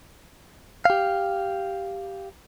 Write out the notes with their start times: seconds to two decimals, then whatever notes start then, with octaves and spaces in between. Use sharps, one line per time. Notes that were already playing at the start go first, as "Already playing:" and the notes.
0.85 G4 F5